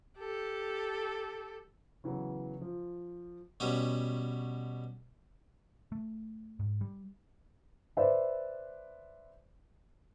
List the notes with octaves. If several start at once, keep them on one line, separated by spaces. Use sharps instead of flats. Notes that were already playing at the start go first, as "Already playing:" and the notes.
G4 A4
C#3 E3 F#3 B3
F3
B2 G3 C#4 B4 F#5
A3
G#2
G3
B4 C5 D5 E5